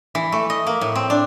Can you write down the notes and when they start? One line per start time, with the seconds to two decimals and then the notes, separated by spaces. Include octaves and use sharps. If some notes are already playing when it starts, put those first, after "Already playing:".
0.15 E3
0.32 A3
0.50 D#5
0.67 A#3
0.81 A2
0.95 C4
1.10 D4